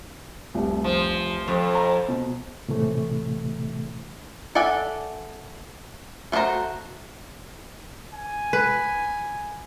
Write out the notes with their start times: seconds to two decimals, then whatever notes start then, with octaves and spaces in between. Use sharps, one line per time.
0.54 F1 C2
0.84 F3
1.48 F2
1.75 A#5
2.08 B2
2.68 A2 C3 E3 A3
4.55 A4 D5 E5 F#5 G#5
6.32 A3 F4 F#4 C5 A#5
8.11 G#5
8.53 B4